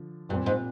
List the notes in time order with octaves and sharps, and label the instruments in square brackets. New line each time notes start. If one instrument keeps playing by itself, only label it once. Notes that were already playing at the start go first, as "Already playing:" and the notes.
Already playing: [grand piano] D3 F3
[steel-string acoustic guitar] G2 [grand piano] A#2 G3 C4
[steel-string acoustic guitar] G#2